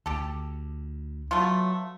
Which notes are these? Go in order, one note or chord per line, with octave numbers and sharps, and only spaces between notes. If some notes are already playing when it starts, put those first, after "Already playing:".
D2 G4 A4
F#3 A3 B3 F4